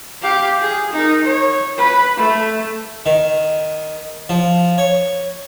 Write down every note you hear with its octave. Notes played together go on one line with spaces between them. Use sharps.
G4 F5
G#4
D#4 A#4
C#5
B4
A3
D#3
F3
C#5